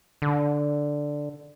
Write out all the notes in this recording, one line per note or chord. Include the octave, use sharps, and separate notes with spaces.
D3